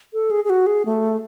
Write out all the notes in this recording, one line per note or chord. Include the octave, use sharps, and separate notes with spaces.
A4
G#4
G#4
F#4
G#4
A3